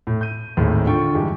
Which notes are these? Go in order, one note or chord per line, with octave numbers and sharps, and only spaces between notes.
A2
G6 D#7
G#1 D#2 A2 G#3
D3 F4 G5 C#6
G2 E3 G#3 G4